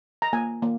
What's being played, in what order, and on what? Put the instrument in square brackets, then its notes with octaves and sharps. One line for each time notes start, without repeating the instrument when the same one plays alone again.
[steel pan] A#5
A#3 G#5
A#3